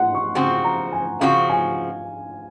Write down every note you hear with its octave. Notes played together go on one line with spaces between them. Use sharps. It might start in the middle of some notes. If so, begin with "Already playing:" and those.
Already playing: F#5 C6
C#6
C#3 F3 C4 F#4 C6
A#5
G#5
C#3 F3 C4 F#4 F5
G#5